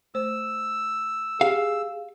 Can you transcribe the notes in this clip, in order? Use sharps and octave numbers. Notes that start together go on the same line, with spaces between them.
A3 C5 E6
G4 G#4 F5